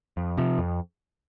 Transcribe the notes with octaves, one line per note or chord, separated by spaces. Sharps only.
F2
C3 F3
F2